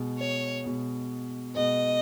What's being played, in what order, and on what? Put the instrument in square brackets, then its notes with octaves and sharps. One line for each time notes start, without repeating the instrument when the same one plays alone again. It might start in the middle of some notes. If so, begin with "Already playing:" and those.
Already playing: [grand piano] B2 G#3 B3
[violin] C#5
[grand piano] B2 G#3 B3
[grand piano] B2 G#3 B3 [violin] D#5